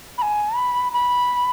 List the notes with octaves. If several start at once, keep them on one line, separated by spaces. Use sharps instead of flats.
B5
G#5
B5
B5